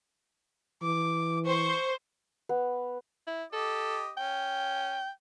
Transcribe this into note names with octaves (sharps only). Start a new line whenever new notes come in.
E3 D6
C5 C#6
B3
E4
G4 A4 D#5
C#4 G5